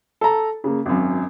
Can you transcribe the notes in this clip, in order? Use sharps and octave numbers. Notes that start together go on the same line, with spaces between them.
A4 A#5
C#3 A#3
G#1 F#2